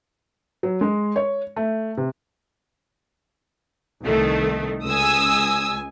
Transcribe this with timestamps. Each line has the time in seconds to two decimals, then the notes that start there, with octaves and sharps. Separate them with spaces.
0.63 F#3
0.81 G#3
1.16 C#5
1.56 A3
1.97 C3
4.02 C2 D#3 A3
4.85 C#2 G#5 D#6 E6